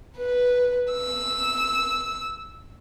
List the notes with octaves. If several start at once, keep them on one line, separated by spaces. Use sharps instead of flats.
B4
E6